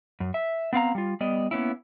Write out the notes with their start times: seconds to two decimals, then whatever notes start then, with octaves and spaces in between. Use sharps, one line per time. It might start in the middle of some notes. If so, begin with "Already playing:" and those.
0.20 F#2
0.34 E5
0.73 B3 C4 F5 A#5
0.95 G3 F4
1.20 G3 B3 D5 D#5
1.51 A#3 B3 C#4 E4